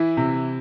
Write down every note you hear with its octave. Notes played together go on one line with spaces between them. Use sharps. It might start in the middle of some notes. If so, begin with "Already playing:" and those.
Already playing: E3 E4
C3